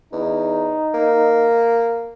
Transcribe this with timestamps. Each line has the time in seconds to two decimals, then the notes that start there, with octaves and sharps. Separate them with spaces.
0.12 E2 D#4
0.94 A#3